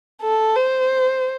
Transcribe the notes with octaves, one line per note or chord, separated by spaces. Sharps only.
A4
C5